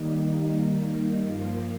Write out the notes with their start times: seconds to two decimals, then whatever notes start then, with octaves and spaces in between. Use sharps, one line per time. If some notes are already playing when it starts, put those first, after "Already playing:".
Already playing: D#3 G3 A#3 D#4
1.24 G2 F3 A#3 F4